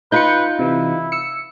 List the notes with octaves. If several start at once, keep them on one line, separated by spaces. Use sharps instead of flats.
D#4 F4 B4 G6 C#7
C3 E3 E4
E6 C#7